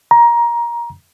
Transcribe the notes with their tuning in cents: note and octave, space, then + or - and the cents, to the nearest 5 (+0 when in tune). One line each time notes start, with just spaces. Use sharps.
A#5 +20